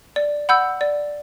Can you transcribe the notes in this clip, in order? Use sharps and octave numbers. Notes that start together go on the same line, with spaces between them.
D5
F#5 B5 E6 G6
D5